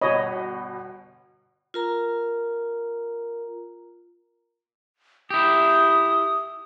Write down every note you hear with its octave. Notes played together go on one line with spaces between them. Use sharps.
G1 B2 C#5 D#5 B5
F4 A#4 A#5
E4 G4 D#6